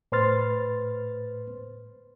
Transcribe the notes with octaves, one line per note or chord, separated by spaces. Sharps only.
A2 B4 C5 C6 F6 A6